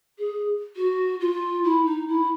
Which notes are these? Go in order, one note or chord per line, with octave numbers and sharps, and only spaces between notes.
G#4
F#4
F4
E4
D#4
E4